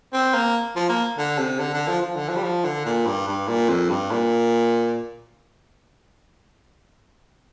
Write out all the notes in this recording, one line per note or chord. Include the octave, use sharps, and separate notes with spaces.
C4
A#3
F3
A#3
D3
C3
D3
D3
F3
F3
D3
F3
G3
F3
D3
A#2
G2
G2
A#2
F2
G2
A#2